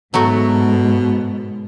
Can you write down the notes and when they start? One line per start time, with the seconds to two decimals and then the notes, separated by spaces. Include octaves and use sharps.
0.14 G#2 B2 F#3 A3 F#4